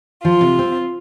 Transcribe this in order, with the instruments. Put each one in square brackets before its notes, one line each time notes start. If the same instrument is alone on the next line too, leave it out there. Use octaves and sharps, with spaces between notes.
[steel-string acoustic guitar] F3 [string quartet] F4
[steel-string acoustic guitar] C3
C4